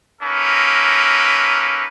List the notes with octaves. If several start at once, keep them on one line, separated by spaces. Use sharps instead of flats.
A#3 C#4 D#4 A4 B4